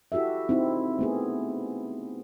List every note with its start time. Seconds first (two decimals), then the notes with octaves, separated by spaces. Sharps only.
0.12 E4 F#4 G4 A4 E5
0.49 C4 D#4 E4
0.99 A3 B3 G#4